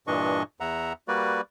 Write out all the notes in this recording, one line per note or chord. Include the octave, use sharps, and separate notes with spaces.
G2 A#2 E3 D4 D#5 C#6
E2 E5 F#5 A#5
G3 A#3 F#4 B4 D5